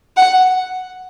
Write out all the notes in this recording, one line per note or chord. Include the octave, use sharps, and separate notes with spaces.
F#5